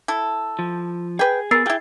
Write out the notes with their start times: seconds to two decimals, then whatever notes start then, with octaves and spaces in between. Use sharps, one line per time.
0.08 E4 A4
0.59 F3
1.19 G#4 B4 G5
1.51 B3 G#4 A#4 E6 A6 C7
1.66 E4 F4 G#4 G5